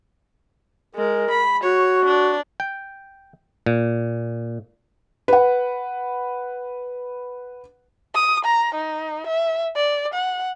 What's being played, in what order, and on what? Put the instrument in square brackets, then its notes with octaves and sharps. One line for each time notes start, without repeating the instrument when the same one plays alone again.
[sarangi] G#3 [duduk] A#4
[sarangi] B5
[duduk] F#4 [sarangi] C#5
[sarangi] D4
[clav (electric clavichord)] G5
A#2
[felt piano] B4 F#5
[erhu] D#6
A#5
D#4
E5
D5
F#5